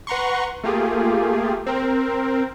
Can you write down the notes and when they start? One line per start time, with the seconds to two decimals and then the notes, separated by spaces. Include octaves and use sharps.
0.07 B4 F#5 A#5 C6 C#6
0.64 A3 A#3 F4 G4 G#4
1.67 C4 A#4